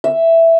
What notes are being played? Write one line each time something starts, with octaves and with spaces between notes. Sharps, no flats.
E5